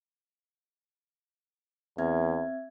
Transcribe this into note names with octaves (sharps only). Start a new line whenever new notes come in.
E2 C4 E5 G#6